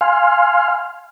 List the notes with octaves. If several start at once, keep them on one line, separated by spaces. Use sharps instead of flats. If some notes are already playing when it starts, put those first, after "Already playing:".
F5 G#5 C6 F6